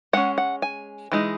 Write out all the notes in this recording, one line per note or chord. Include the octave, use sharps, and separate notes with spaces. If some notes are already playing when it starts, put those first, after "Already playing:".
G#3 C#4 F#5
F#5
G#5
E3 G#3 D#4